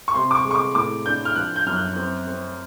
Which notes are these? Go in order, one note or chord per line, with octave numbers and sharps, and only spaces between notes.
C#6
C3 C6
D6
C#6
G#3
C#6
D6
A2 D6
D4 G6
F6
F3 F#6
G6
F#2 F6
F#6
C4
C4